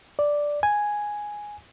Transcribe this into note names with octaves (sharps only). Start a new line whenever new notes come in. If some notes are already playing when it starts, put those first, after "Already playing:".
D5
G#5